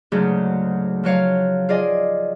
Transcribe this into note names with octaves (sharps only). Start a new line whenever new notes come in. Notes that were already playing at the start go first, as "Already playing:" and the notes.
D2 G#2 C#3 F#3 G#4
F3 F#3 C#5 F5
F4 G#4 D5 D#5 G#5